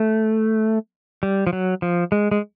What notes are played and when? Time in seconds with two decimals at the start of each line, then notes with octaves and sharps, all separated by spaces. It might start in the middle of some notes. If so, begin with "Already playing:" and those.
Already playing: A3
1.23 G3
1.47 F3
1.53 F#3
1.82 F3
2.12 G#3
2.31 G#3